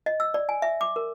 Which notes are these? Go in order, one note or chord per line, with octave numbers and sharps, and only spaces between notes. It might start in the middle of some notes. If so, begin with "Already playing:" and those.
D#5
E6
D5
G#5
E5
D6
A#4